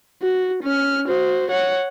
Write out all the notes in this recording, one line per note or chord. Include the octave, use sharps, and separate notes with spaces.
F#4
C#4 F6
F#4 C5
C#5 F#5